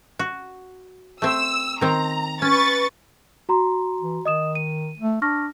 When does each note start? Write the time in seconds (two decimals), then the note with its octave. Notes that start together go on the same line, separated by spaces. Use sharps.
0.19 F#4
1.22 A3 C4 E6
1.81 D#3 C4 A#5
2.42 C#4 B4 C#6 A6
3.49 F#4 A#5 C6
4.01 E3
4.25 D#3 D#5 D#6 E7
4.55 D#7
4.99 A3
5.22 D4 C#6 F6 A#6